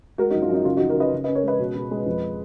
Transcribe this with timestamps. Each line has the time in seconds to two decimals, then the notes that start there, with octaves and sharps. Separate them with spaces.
0.18 G#3 F#4 A#4
0.31 D#4 F#4
0.35 F#2
0.42 F4
0.49 F#2 D#4
0.65 C#3 F4
0.77 D#4 F#4
0.81 C#3
0.90 F#4 A#4
0.97 C#3 B4 D#5
1.13 C#3
1.24 B4 D#5
1.28 C#4
1.35 A#4 C#5
1.43 G#3 B4 D#5
1.59 B2
1.76 B2
1.91 G#3
2.06 F2